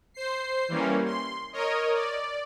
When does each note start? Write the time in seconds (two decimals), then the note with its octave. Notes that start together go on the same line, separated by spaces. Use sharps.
0.14 C5 C7
0.68 E3 G3 A#3 C#4
1.05 C6
1.53 A#4 C#5 D#5
1.94 D5